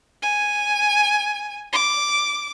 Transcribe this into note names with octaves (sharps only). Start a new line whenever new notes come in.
G#5
D6